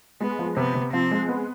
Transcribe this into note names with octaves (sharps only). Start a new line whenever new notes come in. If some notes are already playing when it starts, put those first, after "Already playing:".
G#3 B3
F3
C3 B3
C3
F3 C4
G#3
B3